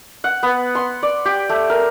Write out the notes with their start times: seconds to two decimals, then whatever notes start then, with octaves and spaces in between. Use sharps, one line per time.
0.24 F#5
0.43 B3
0.75 C6
1.03 D5
1.25 G4
1.49 A3
1.70 A#4